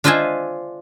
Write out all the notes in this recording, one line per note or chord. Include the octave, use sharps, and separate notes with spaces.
D4 F4 C5 D#5 E5 G#5